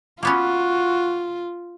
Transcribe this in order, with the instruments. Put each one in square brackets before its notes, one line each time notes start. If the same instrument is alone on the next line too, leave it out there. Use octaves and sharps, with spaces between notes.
[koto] A#3 B3 C#4 [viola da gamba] F4 [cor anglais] F#4